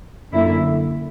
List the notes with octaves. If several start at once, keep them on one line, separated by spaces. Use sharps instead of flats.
F#2 D3 A#3 E4